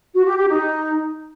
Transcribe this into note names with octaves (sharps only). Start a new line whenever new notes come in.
F#4
G4
G4
D#4